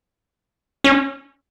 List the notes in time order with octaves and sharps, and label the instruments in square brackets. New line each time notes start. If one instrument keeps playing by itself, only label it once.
[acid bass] C#4